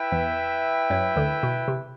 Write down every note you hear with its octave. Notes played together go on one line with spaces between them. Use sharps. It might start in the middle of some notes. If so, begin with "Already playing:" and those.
Already playing: E4 B4 E5 G5
E2 E3
F#2 F#3
D2 D3
B2
C3